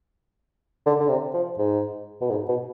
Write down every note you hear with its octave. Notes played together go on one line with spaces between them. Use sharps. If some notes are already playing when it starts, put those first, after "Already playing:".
D3
D3
C3
F3
G#2
B2
G#2
B2